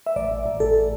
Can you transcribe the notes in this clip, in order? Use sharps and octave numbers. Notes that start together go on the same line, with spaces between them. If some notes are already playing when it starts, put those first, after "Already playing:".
E5
A1 D5
A1
A1
A1 A4